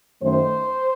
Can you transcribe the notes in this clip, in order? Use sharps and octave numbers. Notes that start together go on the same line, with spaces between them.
F#2 D#3 A3 C5